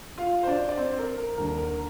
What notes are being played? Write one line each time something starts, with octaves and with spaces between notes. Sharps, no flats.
F4 F5
C5
D4 D5
D5
C4 C5
A#4
A#4
D#2 D3 G3 A#4
A#4